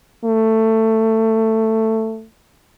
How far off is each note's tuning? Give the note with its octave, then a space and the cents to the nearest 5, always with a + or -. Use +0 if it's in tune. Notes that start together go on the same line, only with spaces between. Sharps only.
A3 +15